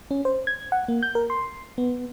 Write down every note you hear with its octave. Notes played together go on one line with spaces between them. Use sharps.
C#4
C5
G#6
F#5
A#3
G6
A#4
C6
B3